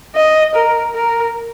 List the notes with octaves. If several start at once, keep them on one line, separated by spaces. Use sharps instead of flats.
D#5
A#4
A#4